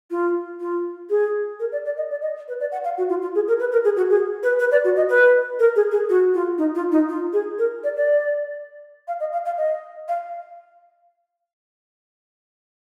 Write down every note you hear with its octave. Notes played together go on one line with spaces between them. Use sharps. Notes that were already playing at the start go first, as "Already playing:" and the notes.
F4
F4
G#4
A#4
D5
D5
D#5
D5
D#5
B4
D5
F#5
F5
F#4
F4
F4
G#4
A#4
B4
A#4
G#4
F#4
G#4
B4
B4
D5
F#4
D#5
B4
A#4
G#4
G#4
F#4
F4
D#4
F4
D#4
F4
G#4
A#4
D5
D5
F5
D#5
F5
F5
D#5
F5